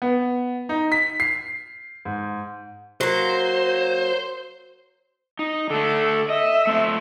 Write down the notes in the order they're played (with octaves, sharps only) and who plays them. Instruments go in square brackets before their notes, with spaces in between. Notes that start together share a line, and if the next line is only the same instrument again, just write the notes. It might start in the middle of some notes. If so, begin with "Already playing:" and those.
[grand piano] B3
D#4
B6
C7
G#2
[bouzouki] F#3 A#3 [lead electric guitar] C5
[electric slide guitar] D#4
[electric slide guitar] D3 A3 [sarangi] A4
[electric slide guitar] D#5 [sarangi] E5
[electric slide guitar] A3 C4